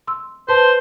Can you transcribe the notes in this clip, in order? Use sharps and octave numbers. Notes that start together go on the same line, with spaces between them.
C6 E6
B4 C5 A5